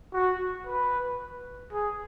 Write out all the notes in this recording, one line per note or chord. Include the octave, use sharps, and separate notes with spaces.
F#4
B4
G#4